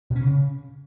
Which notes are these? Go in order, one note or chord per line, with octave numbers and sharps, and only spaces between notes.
B2
C#4
C3
C#3